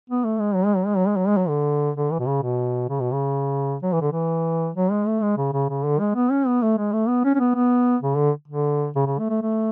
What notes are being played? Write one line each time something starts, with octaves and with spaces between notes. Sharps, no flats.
B3
A3
G#3
F#3
G#3
F#3
G#3
F#3
G#3
F#3
G#3
F#3
D3
D3
E3
B2
C#3
B2
C#3
B2
C#3
F#3
E3
D3
E3
F#3
G#3
A3
G#3
C#3
C#3
C#3
D3
G#3
B3
C#4
B3
A3
G#3
A3
B3
C#4
C#4
B3
B3
C#3
D3
D3
C#3
C#3
A3
A3
A3